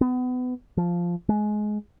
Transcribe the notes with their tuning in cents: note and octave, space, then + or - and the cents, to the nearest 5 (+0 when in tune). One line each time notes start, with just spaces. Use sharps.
B3 +25
F3 -5
G#3 +20